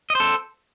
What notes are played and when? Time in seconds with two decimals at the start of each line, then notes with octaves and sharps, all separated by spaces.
0.10 D#5
0.15 C5
0.20 A4